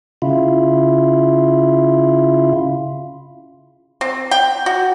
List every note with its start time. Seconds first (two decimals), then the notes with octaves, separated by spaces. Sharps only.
0.22 C#3 E4 F4
4.01 C4
4.31 G5
4.66 F#4